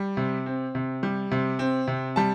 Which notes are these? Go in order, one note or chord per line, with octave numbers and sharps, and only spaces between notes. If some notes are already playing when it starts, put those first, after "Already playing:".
Already playing: G3
C3
C4
C3
G3
C3
C4
C3
G3 A5